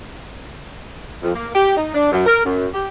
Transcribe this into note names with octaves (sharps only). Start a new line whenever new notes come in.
F2
A#3
G4
D#4
D4
F#2
A#4
F#2
G4